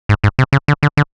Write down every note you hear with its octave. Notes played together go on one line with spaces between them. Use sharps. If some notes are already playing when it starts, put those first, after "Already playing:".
G#2
G#2
C3
C#3
D3
D3
D3